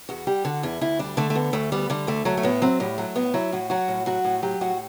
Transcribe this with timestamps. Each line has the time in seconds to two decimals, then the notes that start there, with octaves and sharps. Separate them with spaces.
0.09 E2 F#4
0.27 G3 G4
0.45 D3 F#4
0.63 E2 E4
0.81 D2 E4
0.99 G3 D4
1.17 D3 A3
1.30 A3
1.35 D2 B3
1.53 D2 A3
1.72 G3 B3
1.90 D3 G3
2.07 D2 A3
2.25 F#3 A3
2.37 A3
2.43 A2 B3
2.62 F#3 C4
2.80 A2 G3
2.98 F#3 A3
3.16 A2 B3
3.34 F#3 E4
3.52 A2 F#4
3.70 F#3 F#4
3.88 A2
4.06 F#3 F#4
4.25 A2
4.43 F#3 G4
4.61 A2 F#4